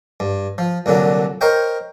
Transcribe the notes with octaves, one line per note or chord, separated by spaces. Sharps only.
G2
F3
C2 A#2 D3 F#3
A#4 C5 C#5 D#5 G5